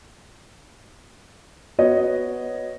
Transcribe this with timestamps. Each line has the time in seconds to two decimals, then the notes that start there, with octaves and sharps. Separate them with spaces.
1.78 B3 F#4 C#5 D#5